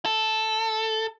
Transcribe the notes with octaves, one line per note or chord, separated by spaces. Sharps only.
A4